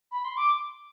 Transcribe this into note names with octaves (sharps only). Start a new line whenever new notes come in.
B5
C6
D6